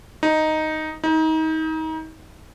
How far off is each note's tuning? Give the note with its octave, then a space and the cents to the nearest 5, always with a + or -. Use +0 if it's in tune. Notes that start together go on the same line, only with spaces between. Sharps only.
D#4 +0
D#4 +30